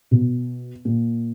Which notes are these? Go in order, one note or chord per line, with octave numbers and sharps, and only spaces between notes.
B2
A#2